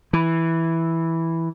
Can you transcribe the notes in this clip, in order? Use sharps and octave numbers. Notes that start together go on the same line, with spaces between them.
E3